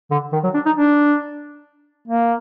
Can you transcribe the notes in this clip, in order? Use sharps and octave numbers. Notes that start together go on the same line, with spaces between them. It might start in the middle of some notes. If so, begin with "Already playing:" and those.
D3
D#3
F#3
D4
D#4
D4
A#3